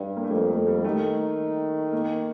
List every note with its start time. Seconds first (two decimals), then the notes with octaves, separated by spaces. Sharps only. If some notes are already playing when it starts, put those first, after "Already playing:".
Already playing: G2
0.17 A#3
0.24 A3
0.31 F2 G3
0.49 A3
0.67 G3
0.84 D#3 A3
1.93 A#3